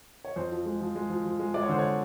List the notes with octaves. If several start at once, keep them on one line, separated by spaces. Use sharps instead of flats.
C#5
F2 C5
F3
G#3
F3
G#3
F3
F3
G#3
G#3 D5
C#5
D3 C5
C#5